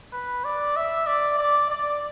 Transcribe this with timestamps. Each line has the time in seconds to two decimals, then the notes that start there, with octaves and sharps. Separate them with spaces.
0.13 B4
0.44 D5
0.76 E5
1.07 D5
1.39 D5
1.70 D5